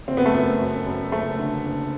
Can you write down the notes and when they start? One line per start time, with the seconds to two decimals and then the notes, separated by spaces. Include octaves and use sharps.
0.08 F#1 C4
0.17 B3
0.26 A3
0.34 F#2 B3
0.61 F#2
0.86 F#2
1.12 F#1 A3
1.39 D3
1.65 F#1